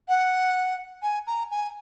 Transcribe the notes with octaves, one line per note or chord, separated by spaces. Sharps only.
F#5
G#5
A#5
G#5